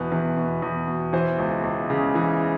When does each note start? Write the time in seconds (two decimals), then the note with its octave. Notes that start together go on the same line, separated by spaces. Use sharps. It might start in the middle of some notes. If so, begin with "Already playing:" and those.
Already playing: E2 B2 B4
0.12 E2
0.37 B2
0.62 E2
0.87 B2
1.13 E3 C5
1.39 C#2
1.64 C#2
1.90 C#3
2.15 E3